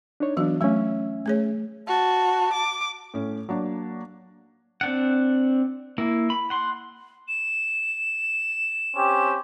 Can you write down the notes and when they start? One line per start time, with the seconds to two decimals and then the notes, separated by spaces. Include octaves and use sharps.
0.20 D4 D#4 C#5
0.37 E3 F#3 B3 D4 F#4
0.61 F#3 A3 C#4 E5
1.26 A3 G#4 C#5
1.88 F#4 A5
2.53 D6
3.14 A2 C#4
3.49 F#3 A#3 D4
4.81 C4 D4 F#5
5.98 A#3 E4
6.30 B5
6.50 F#5 C6
7.28 E7
8.97 C4 C#4 G4